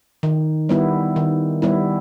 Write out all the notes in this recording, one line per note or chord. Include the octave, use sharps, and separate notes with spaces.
D#3
G3 B3 E4
D#3
G3 B3 E4